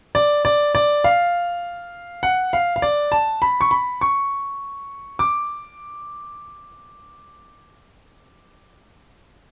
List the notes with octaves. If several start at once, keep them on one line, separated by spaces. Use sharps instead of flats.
D5
D5
D5
F5
F#5
F5
F5
D5
A5
B5
C#6
B5
C#6
D6